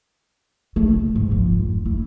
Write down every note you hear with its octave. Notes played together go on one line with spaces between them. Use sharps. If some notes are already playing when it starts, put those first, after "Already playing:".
A3
C3
G#2
F3
F1
E4